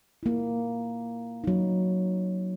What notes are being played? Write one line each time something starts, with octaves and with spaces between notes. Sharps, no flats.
A#3 E4
F#3 D#4